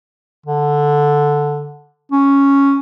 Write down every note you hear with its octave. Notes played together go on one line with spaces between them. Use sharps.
D3
C#4